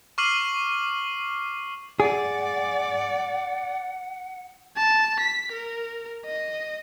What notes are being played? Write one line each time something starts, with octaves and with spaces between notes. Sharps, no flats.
C#6 D6 F6 C7 D#7 F#7
G#4 D5 F#5
A5
B6
A#4
D#5